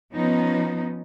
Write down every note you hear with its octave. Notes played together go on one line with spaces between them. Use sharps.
F3 B3 C#4 D#4